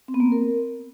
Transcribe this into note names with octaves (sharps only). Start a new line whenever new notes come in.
C4
B3
A#3
C4
A#4